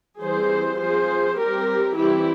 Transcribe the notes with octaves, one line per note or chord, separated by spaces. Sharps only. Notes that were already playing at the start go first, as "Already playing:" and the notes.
E3 G3 C4 G#4 C5
F3 C4 G#4 C5
G3 C4 G4 A#4
E3 G3 C4 E4 G4